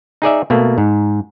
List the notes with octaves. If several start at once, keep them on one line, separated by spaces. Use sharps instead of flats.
D#4 G#4 D5 E5
B2 A3 A#3
G#2